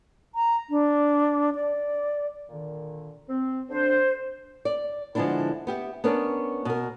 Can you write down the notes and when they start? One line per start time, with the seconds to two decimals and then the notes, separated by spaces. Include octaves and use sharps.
0.35 A#5
0.70 D4
1.55 D5
2.50 A#2 D3 D#3
3.29 C4
3.70 D3 D4 C5
4.65 D5
5.15 D3 F3 G#3 B3 D4 E4
5.67 B3 G4 E5
6.04 B3 C#4 D4 A#4 C#5
6.65 B2 A#4